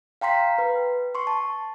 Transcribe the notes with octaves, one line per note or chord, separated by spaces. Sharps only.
F5 G5 A#5 C6 B6
B4
C6 C#6
A5